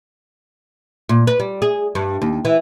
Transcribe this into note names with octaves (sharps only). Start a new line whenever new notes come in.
A#2
B4
G3
G#4
G2
D#2
E3